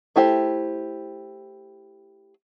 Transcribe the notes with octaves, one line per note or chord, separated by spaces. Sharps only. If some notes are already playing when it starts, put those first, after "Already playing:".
A3 E4 G4 C5